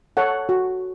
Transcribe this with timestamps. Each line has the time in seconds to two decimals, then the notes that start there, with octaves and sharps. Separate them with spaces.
0.17 A4 C#5 F#5
0.49 F#4